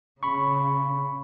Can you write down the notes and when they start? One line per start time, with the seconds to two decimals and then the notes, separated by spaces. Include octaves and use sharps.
0.23 C#3 B5 C#6